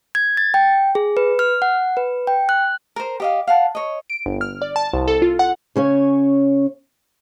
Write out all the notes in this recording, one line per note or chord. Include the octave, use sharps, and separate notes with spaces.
G#6
A6
G5
G#4
B4
F6
F#5
B4
G5
F#6
A#4 C5
G4 D#5 F5
F5 F#5 A5
C#5 D#5
D7
G1
F6
D5
A5
C2
A4
F4
F#5
C#3 C#4 C#5